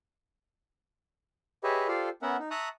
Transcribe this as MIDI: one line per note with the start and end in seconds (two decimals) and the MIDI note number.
1.64 1.87 67
1.64 1.87 68
1.64 1.87 71
1.64 1.87 73
1.64 1.87 75
1.64 1.87 76
1.88 2.09 65
1.88 2.09 67
1.88 2.09 69
1.88 2.09 72
1.88 2.09 74
1.88 2.09 77
2.22 2.37 59
2.22 2.37 61
2.22 2.37 70
2.22 2.37 76
2.22 2.37 78
2.39 2.49 63
2.51 2.69 76
2.51 2.69 81
2.51 2.69 82
2.51 2.69 85
2.51 2.69 87
2.51 2.69 90